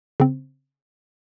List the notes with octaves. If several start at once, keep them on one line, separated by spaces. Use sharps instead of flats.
C#3 C4